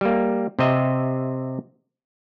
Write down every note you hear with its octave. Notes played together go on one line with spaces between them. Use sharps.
G3 A#3
C3 C4 D#5 E5